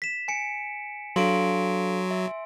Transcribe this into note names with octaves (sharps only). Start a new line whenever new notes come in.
B6 E7
G#5 C#7 D7
F#3 D4 A4 F5 C6 D7
E5